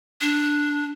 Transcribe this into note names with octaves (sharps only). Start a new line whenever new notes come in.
D4